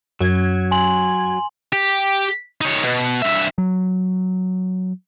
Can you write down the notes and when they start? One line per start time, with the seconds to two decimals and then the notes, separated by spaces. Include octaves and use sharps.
0.21 F#2 F#3 G#6
0.71 G#5 C6 F#7
1.73 G4
2.61 D#4 C#5
2.83 B2
3.22 G2 E5
3.58 F#3